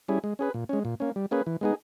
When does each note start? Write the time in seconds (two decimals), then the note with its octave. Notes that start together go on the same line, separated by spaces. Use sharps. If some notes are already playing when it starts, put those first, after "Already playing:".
0.08 G3 C#4 E4 G#4
0.24 G#3
0.39 C#4 G#4 B4
0.54 A#2
0.69 G#3 C#4
0.85 A#2
1.00 A#3 C#4
1.16 G3
1.31 A#3 C#4 G#4 B4
1.47 E3
1.61 G#3 B3 D#4 G#4